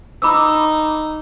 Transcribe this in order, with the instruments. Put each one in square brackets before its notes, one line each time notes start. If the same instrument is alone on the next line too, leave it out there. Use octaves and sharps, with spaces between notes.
[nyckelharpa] D#4 [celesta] B5 D6 E6